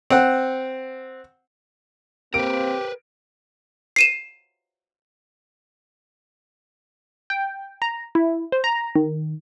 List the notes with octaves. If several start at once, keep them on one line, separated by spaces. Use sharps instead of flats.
C4 F#5
A#3 C4 G4 A#4 B4 D7
C7 D#7 E7
G5
A#5
E4
C5
A#5
D#3